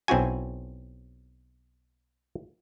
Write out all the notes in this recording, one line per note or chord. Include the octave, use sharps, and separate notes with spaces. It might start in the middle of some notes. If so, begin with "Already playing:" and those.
B1 C4 E4 F#4 G#5